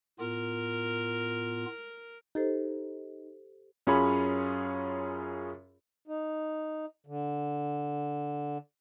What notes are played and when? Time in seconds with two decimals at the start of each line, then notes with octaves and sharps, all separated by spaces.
0.20 A2 B3 F4 A#4
2.35 D#4 G4 A4 C5
3.87 F#2 C#4 F4 G#4 C#5 B5
6.08 D#4
7.07 D3